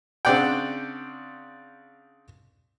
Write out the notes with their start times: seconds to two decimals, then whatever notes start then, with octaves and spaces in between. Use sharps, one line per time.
0.25 C#3 C4 D4 D5 F#5 G5